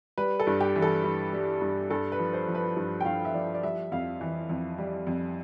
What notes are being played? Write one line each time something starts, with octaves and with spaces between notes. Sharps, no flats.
G3 B4
A4
G2
G4
E3
A4
G2
G3
G2
G2 A4
B4
F3
C5
F3
B4
G2
G5
G2 F5
E5
F3 D5
D5
G3 E5
F2 F5
E3
F2
G3
F2